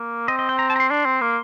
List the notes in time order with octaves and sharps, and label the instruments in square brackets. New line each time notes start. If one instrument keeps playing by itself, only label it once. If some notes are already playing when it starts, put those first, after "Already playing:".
Already playing: [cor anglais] A#3
[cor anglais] C4 [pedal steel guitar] D#5
[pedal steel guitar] D#5
G5
A#5
A5
A#5
C6
[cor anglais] D4 [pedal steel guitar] C6
[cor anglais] C4
A#3